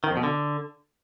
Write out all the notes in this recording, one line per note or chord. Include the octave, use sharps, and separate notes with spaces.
D#3
F2
B2
D3